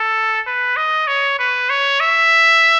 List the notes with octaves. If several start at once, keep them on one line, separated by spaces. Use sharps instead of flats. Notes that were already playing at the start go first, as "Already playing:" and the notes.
Already playing: A4
B4
D#5
C#5
B4
C#5
E5